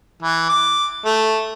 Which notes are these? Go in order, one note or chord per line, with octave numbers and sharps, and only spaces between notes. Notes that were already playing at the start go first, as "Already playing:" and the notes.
E3
D6
A3